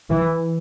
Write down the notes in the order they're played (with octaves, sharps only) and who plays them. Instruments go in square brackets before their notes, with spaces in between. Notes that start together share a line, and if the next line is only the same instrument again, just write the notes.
[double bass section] E3